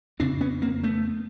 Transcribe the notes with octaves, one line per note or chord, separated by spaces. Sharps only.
F2 C#3 C4 D4
B3 C#4
A#3 C4
A3 B3